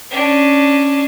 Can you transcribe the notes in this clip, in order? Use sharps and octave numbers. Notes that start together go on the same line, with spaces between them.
C#4 D4